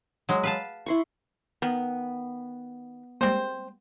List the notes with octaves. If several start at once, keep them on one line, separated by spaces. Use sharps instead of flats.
F#3 G#3
B4 F5 A5
E4 C6 C#6
D#3 B3
G3 G#3 A#3 C4 C5